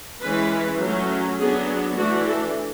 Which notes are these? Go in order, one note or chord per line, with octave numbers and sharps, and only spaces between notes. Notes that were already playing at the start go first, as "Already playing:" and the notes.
E3 G#3 C#4 B4
F#3 A3 C#4
F#3 B3 D4 G#4
E3 A3 D4 F#4
A4